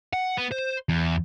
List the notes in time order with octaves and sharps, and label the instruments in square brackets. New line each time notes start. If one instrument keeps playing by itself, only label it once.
[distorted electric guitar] F#5
B3
C5
E2